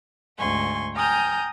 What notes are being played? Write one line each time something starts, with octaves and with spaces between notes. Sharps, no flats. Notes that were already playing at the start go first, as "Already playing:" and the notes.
D2 G#2 G#5 C6 C#6
G5 G#5 A#5 D#6 F6 G6